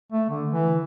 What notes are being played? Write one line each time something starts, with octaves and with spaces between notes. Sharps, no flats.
A3
D3
E3